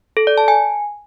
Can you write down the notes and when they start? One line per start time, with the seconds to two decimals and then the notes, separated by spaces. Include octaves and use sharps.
0.17 A4
0.27 D5
0.38 A5
0.48 G#5